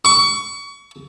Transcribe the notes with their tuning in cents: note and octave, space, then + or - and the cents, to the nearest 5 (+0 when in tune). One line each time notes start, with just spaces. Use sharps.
C#6 +30